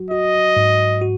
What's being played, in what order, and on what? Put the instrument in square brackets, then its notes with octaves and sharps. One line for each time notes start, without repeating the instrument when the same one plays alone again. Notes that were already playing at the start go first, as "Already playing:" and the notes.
Already playing: [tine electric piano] F#3 F#4
[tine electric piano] F#4 [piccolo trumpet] D#5
[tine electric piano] G#2
F#4